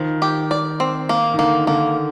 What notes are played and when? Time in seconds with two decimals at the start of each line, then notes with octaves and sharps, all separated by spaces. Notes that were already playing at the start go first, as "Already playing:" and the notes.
Already playing: D#3 F3
0.22 G4
0.51 D5
0.80 C4
1.09 A#3
1.34 D#3
1.38 D3 A#3
1.67 D3 A#3